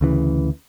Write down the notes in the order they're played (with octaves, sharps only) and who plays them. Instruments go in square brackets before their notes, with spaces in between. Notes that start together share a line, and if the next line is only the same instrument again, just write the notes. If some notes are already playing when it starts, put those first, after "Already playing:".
[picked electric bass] D2 C#3 E3